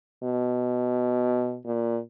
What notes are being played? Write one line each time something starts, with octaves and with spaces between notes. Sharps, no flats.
B2
A#2